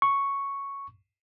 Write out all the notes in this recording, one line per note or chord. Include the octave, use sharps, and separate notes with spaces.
C#6